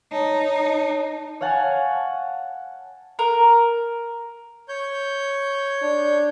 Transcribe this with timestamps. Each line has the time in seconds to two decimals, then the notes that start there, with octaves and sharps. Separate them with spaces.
0.12 D#4 C#5 A5
1.41 C#5 F5 F#5 G#5 A5
3.19 A#4
4.68 C#5 G6
5.82 D4